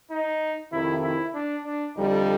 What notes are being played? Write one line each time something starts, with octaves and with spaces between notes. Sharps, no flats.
D#4
F2 C3 D#3 E4
E4
D4
D4
F2 D3 G3 D#4